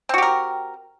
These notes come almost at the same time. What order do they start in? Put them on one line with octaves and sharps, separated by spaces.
C4 F#4 G4 A#4